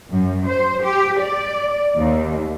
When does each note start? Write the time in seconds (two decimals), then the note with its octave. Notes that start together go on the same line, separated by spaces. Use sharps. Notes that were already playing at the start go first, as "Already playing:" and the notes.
0.10 F#2
0.46 C5
0.83 G4
1.19 D5
1.97 D#2